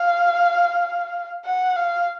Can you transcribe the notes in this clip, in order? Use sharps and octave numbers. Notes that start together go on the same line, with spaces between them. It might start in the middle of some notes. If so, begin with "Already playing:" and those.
Already playing: F5
F#5
F5